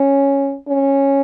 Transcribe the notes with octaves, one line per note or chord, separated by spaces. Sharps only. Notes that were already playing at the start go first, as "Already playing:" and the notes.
Already playing: C#4
C#4